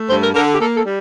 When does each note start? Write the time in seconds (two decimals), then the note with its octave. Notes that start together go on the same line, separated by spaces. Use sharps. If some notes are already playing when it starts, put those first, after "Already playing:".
Already playing: A3
0.10 G2 C5
0.23 A#4
0.34 D3 A#4
0.47 A4
0.54 G4
0.60 A#3 A4
0.77 A4
0.85 G3